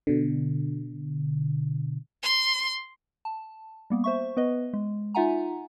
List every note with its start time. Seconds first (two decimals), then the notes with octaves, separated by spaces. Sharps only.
0.07 B2 D3
2.23 C6
3.25 A5
3.90 G3 A#3 B3
4.04 C5 E5 C#6
4.37 B3 B4 D#5
4.73 G#3
5.15 D#4 F4 E5 F#5 G#5 A#5